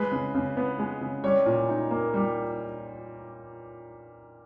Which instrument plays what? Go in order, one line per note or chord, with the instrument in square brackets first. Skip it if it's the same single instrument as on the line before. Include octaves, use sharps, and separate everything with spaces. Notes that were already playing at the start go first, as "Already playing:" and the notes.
Already playing: [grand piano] G#3 B4
C#3
C#3
B3
G#3
C#3
G3 C#5
A#2
D#4
A#3
G3